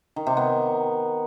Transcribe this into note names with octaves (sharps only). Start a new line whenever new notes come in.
D#3
C3
B3